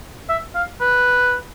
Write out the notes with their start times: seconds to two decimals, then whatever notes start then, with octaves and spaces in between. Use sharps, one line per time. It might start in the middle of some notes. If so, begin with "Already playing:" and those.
0.29 E5
0.55 F5
0.81 B4